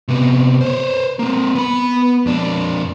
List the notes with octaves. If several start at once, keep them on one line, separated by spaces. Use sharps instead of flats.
C3 B3
C5 C#5
A#3 C4
B3 B5
F2 D4